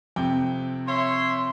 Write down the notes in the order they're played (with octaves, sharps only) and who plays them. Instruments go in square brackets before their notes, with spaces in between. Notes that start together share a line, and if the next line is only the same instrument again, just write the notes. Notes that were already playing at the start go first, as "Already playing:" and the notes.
[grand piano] F2 C3 G5
[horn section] C#5 E5 C6